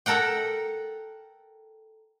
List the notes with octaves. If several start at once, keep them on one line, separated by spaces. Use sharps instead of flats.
A4 A#4 F#5 G5